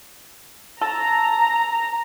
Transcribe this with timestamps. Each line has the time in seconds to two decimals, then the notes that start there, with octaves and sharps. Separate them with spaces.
0.81 A4 A#5